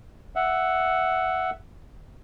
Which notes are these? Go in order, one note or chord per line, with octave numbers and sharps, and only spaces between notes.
E5 F#5